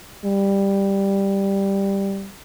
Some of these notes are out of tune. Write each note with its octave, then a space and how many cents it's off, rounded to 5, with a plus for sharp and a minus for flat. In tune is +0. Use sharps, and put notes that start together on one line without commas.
G3 +5